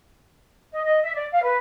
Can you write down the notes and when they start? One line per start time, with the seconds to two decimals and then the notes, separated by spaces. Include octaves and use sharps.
0.72 D#5
0.84 D#5
1.02 E5
1.14 D5
1.32 F5
1.43 B4